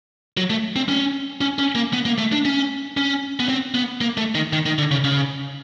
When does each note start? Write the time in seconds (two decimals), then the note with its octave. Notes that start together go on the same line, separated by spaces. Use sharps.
0.37 F#3
0.50 A3
0.76 C4
0.89 C#4
1.41 C#4
1.58 C#4
1.75 A#3
1.93 B3
2.05 A#3
2.18 A3
2.32 D4
2.45 C#4
2.97 C#4
3.40 B3
3.48 C4
3.74 B3
4.01 A#3
4.17 A3
4.35 D#3
4.53 D#3
4.66 D#3
4.78 D3
4.91 C#3
5.04 C#3